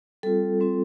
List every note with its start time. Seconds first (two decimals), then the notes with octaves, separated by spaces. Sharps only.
0.23 G3 C4 F4 A4
0.60 G3 C4 F4